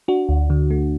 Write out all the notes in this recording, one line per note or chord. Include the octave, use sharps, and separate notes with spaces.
D4 F#4
D2
D3
A3